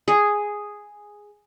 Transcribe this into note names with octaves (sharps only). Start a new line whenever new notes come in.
G#4